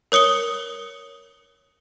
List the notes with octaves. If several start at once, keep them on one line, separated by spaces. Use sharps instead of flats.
A#4 C#5 D#6 C#7 G7